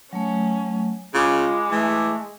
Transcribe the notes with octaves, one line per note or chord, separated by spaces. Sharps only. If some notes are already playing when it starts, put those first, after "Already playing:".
F#3 A3 C#4
C#3 G#3 F4 B5 D6
E3 A3